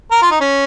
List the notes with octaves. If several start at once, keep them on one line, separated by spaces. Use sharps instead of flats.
A#4
F4
D#4
C#4